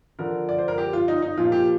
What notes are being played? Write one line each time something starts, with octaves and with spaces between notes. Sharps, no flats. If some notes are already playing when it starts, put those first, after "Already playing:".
D3 F3 A#4
D5
C5
A#4
G4
F4
D#4
D#4
A#2 F3 F4
G4